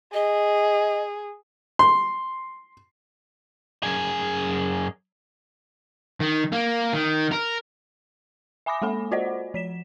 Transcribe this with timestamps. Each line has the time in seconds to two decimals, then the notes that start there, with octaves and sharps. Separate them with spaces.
0.14 G#4 D#5
1.79 C6
3.83 F#2 G#4
6.20 D#3
6.52 A#3
6.93 D#3
7.32 A#4
8.66 E5 G#5 B5 D6 D#6 A#6
8.82 G#3 A#3 A4 G#5 B5
9.11 F4 F#4 C5 D5 D#5 F#5
9.54 F3 B6 E7